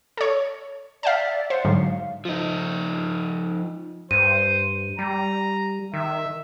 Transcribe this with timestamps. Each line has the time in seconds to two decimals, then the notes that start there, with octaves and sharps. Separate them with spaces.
0.17 A4 C#5
1.03 D5 E5 F5 G5 A5
1.50 C5 F#5
1.65 G#2 D3 F#3 F5
2.25 F3 D#4
4.11 G2 C5 D#7
4.99 G3 A#5
5.94 D#3 E5